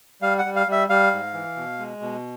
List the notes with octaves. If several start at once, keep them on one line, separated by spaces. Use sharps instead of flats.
G3 F5
F#5
G3
F5
G3 E5
G3 F5
G#2
E3
B2
G#3
B2